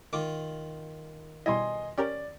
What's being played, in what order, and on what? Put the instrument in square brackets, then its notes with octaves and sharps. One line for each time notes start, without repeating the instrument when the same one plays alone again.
[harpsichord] D#3 F4 [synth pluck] D6
[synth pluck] B2 G3 E4 [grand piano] D#5 G#5 C6
[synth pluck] C#4 G4 A#4 [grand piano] D5